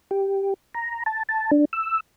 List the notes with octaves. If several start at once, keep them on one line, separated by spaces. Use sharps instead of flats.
G4
A#5
A5
A5
D4
E6